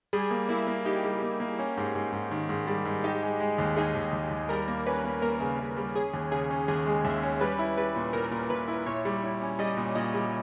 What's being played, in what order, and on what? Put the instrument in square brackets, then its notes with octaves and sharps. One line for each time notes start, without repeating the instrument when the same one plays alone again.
[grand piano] G3 [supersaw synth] G#4
[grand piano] A#3
[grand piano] A#3 [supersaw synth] E4
[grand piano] A#3
[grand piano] D#4 [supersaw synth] G4
[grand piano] G3
A#3
A#3
C#4
G#2
G#2
G#2
D#3
G#2
G3
G#2
[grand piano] D#4 [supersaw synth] G4
[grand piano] G#3
G#3
D#2
[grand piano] D#4 [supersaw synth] G#4
[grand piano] D#2
D#2
D#2
[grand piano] G3 [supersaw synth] A#4
[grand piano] A#3
[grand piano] C#4 [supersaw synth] B4
[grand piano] A#3
[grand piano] A#3 [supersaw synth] A#4
[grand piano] C#3
C#3
G3
[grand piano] C#4 [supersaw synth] G#4
[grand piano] D#2
[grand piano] C#3 [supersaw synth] G#4
[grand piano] C#4
[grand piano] D#2 [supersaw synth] G#4
[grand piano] G#3
[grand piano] D#2 [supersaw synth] E5
[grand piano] C#4
[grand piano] G3 [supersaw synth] B4
[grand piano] E4
[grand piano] G3 [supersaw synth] B4
[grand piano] A#2
[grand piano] A#2 [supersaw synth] A#4
[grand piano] A#2
[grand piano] A#2 [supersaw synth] B4
[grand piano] E4
[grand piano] A#2 [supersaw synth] C#5
[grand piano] G3
E4
C#4
[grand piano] G3 [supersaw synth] D#5
[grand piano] A#2
[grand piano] A#2 [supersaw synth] D#5
[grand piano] G3